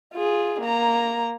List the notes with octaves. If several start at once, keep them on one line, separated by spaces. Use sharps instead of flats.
F4 G#4
A#3 A#5